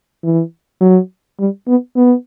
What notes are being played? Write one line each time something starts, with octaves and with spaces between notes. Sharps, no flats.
E3
F#3
G3
B3
B3